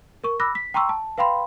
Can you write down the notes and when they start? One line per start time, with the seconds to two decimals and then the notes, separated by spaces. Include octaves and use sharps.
0.24 A#4 C#6
0.40 B5 D6 E6 F#6 A#6
0.55 B6
0.74 G5 A#5 C6 C#6 E6
0.89 A5
1.18 B4 F5 G5 B5 C6